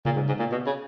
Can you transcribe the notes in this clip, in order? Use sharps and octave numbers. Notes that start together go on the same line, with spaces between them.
A#2 C#3
G#2
G#2
A#2
B2
C#3